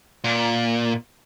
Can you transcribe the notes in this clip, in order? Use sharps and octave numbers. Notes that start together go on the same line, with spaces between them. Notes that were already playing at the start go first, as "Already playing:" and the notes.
A#2